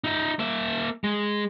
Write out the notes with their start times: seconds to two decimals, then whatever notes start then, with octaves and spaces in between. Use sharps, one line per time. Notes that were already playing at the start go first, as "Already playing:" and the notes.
0.04 D#4 E5
0.39 A#3 E5
1.04 G#3